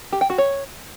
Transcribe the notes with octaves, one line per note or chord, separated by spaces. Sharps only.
G4
G5
F#4
C#5